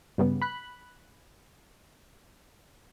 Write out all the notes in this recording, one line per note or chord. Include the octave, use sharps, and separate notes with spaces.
G2 C#3 G3 B3
B5 F#6